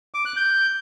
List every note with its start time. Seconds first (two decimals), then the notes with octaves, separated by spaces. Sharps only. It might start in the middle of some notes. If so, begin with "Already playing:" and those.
0.14 D6
0.25 F#6
0.36 G6